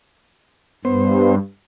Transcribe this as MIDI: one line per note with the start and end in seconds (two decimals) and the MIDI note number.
0.85 1.38 43
0.85 1.35 59
0.85 1.35 72